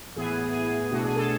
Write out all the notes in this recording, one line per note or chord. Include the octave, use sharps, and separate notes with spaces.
A2 E3 B3 E4 G#4
G#4
G#4
B2 A3 D4 F#4
G#4
A4